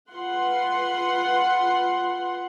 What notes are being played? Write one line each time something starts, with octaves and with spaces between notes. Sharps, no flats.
F4 B4 F#5 C6